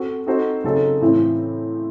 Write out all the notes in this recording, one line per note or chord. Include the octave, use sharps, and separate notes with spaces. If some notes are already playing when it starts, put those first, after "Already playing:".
Already playing: C4 F#4 A4
C4 D#4 F#4 A4 C5
C#3 F#3 C4 D#4 A4
A2 E3 C4 E4 C5